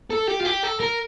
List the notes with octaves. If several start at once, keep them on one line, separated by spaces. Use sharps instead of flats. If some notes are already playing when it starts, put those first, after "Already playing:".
A4
G4
F4
G4
A4
A#4